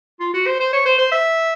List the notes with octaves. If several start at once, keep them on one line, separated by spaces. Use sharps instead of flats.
F4
F#4
C5
C5
C#5
C5
C5
E5